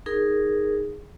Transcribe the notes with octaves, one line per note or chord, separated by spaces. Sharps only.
D#4 G#4 A#4